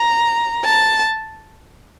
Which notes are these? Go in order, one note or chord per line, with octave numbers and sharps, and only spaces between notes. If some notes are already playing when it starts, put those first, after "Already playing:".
Already playing: A#5
A5